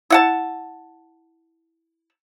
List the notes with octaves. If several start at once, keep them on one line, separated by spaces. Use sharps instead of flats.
E4 F#5 A5